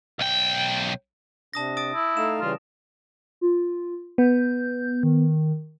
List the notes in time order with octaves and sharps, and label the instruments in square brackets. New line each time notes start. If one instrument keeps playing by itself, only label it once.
[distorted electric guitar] B1 G5
[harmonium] C3 D4 [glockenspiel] A5 D#6 A#6
[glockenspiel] D#6 A6 D7
[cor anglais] E4
[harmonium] A3 D#4 F5 [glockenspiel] E7
[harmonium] C#3 E3 G3 [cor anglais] F4
[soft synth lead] F4
[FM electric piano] B3 [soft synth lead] G6
[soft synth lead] D#3